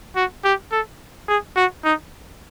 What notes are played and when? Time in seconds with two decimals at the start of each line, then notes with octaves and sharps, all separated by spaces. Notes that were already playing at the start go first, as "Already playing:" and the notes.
0.16 F#4
0.44 G4
0.72 A4
1.28 G#4
1.56 F#4
1.84 D#4